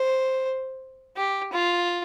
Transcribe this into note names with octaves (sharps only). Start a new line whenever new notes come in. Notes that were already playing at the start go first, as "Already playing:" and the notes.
Already playing: C5
G4
F4